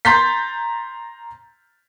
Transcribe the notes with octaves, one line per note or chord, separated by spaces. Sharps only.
A#5 C6 G6 A6 B6